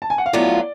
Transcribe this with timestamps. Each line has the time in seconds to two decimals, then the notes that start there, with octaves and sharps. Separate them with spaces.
0.02 A5
0.10 G#5
0.18 F#5
0.26 F5
0.33 A2 F#3 B3 F4 D5